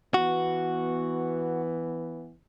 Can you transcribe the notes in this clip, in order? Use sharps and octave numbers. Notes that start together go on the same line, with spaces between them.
E3 B3 F#4